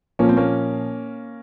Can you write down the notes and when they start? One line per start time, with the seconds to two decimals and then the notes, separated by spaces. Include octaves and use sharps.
0.19 A#2 F3 A#3 C#4
0.29 C4
0.37 A#3 C#4